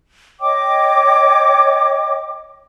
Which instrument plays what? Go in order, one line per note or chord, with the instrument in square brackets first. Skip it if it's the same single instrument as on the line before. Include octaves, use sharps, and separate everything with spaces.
[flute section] C#5 D#5 G5 D6